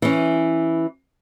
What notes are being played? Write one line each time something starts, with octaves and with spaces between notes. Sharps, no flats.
E3 C#4